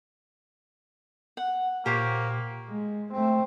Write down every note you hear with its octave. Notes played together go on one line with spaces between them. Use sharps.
F#5
A#2 A#3 G4 C5 C#5
G#3
A3 C4